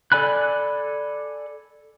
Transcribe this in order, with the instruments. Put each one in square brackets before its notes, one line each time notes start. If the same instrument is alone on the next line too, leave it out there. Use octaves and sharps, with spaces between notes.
[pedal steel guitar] A4 D5 G#5 B5 F#6